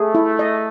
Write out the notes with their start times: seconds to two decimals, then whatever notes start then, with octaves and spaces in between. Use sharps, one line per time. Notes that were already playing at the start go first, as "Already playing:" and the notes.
Already playing: A3 G#4
0.15 E4
0.39 D#5